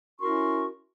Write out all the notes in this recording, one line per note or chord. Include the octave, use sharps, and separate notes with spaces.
C#4 E4 F#4 A#4 C6 C#6